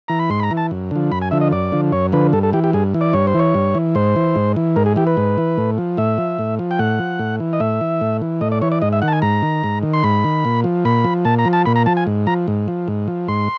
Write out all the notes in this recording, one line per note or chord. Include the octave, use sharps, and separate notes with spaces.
E3 A#5
B5
G#2 C6
B5
A#5
E3
A5
F#2
D3 F3
F#2 B5
G#5
D3 F3 E5
D#5
F#2 D5
D3 F3
F#2 C#5
D3 F3 B4
G2 A4
A4
E3 G4
G4
G2 G#4
E3
D5
G2 C#5
C5
E3 C#5
G2
E3
G#2 C5
E3
G#2
E3
G#2 A#4
G#4
E3 G4
B4
G#2
E3
A2
F3
A2 E5
F3
A2
F3
G5
A2 F#5
F3
A2
E3
D#5
A2 E5
E3
A2
E3
A2 D#5
D5
E3 C#5
D5
G#2 D#5
E5
D#3 F#5
A5
G#5
G#2 A#5
D#3
G#2
D#3
C6
G#2 B5
D#3
A#2
F3
A#2 B5
F3
A#2 A5
A#5
F3
A5
A#2 B5
A#5
F3 A5
G#5
G#2
F3 A#5
G#2
F3
G#2
F3
G#2 C6